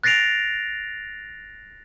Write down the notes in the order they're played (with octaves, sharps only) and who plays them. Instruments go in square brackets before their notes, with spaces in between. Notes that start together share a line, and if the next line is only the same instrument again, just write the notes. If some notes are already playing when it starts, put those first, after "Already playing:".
[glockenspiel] F#6 A6 A#6 C7 D7 F7